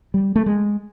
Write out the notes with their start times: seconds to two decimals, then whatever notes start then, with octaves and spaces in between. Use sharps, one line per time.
0.14 G3
0.36 A3
0.46 G#3